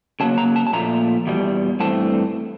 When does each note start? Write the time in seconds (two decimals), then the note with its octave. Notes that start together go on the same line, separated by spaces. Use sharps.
0.20 C#3 F#3 A#3 A5
0.38 A#5
0.56 A5
0.67 A5
0.73 A#2 F3 A3 A#5
1.27 E2 B2 G3
1.80 G2 E3 A3 C4 A5